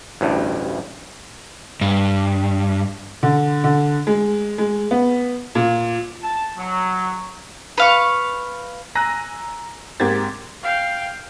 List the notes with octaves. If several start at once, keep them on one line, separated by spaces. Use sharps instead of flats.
A1 D2 G2
G2
D3
D3
G#3
G#3
B3
A#2
A5
F#3
B4 F5 C#6
G#5 A#5 E6 F#6 A#6 D#7
G#2 A#3 C4 G4 G#6 A6
F5 G5